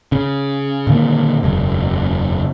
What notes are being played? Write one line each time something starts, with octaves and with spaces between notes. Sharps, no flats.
C#3
A#2 D3 D#3 A#3
E1 F#2 C#3